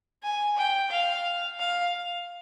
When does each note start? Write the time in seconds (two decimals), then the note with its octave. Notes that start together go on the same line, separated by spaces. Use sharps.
0.23 G#5
0.58 G5
0.91 F5
1.59 F5